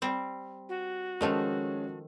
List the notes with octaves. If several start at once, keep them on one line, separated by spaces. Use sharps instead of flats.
G3 C4
F#4
D#3 F3 G#3 A3 C#4